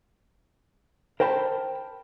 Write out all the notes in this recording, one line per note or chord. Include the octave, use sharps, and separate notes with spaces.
A#4 C5 G5 A5 B5